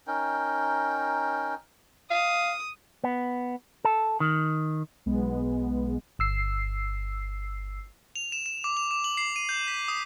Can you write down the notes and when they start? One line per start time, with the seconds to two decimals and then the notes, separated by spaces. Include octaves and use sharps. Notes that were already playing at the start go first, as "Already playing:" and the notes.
0.07 C#4 D#4 A#4 G5
2.11 F5 D#6
3.04 B3
3.85 A4
4.20 D#3
5.06 B1 G#3 B3
6.19 G1 E6 C7
8.16 F7
8.32 E7
8.46 E7
8.64 D6
8.77 F7
8.91 D6
9.04 F#7
9.17 C7
9.36 D#7
9.49 G6
9.68 B6
9.88 D#6